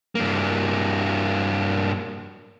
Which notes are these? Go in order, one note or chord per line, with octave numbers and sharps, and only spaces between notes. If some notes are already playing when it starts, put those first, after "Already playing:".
G2 A#3